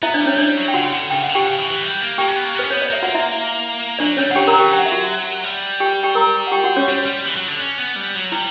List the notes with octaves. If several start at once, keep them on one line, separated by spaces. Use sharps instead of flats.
B3 E4 E5
D4 D5
G3
C#4 C#5
G3 D4 D5
F#3
G5
C#3 F#4 F#5
D3
C#3 G5
F#5
D3
G4 G5
C#3
E3
E3
G3
A#3
A#3 G4 G5
C#4
B3
A#3
B3
C#4 B4
B3 C#5
D5
A#3 E5
F#4 F#5
A#3
E4 E5
F#3 D4 D5
G3 C#4 C#5
C#3 F#5
D3 G4 G5
A#4 A#5
E3
G4 G5
F#3 G5
F#5
E5
F#4 F#5
G3
G4 G5
G4 G5
A#4 A#5
F#5
G4 G5
F#4 F#5
C#4 C#5
G3 F#4
G3
E3
F#3
D3
C#4
B3
G3
F#3
G3 E4